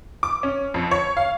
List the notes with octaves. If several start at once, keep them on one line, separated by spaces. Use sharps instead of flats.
D6
C#4
F2
C#5
F5